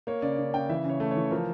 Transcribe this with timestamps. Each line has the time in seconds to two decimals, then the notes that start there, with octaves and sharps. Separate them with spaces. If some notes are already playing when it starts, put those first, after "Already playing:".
0.07 A#3 C#5
0.22 C#3 D5
0.38 C#3
0.54 C#3 G5
0.69 E3 E5
0.84 C#3 C#5
1.00 A3
1.11 C#5
1.16 E3
1.31 F3 A#4